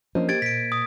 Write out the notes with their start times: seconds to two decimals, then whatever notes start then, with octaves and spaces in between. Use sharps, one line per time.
0.15 F3 A#3 C#4 D4 C5 D#5
0.29 G4 G#6 A6 D7
0.42 A#2 B6 D7
0.72 D#6